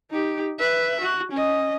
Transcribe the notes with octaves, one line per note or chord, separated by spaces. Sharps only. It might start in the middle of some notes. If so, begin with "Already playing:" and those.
D#4 G4
B4 E5
F#4
C#4 D#5